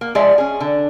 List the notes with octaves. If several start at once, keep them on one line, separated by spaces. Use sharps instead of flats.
A#3
F3 G#3 G#4 D5 E5
C#4 G#4
D3